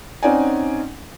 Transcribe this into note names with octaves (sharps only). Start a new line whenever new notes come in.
C4 C#4 D#4 D5 F#5 G#5